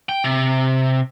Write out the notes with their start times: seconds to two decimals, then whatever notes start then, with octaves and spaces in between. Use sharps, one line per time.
0.09 G5
0.24 C3